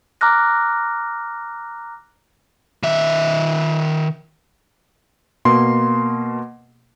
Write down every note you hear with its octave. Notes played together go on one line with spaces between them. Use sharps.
A#5 D6 F6 F#6 A#6
D#3 E5
B2 A#3 C6